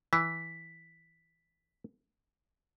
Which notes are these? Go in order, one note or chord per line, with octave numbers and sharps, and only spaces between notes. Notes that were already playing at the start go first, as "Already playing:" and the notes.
E3 B6